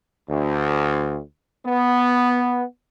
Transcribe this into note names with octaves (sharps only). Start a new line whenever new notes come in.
D2
B3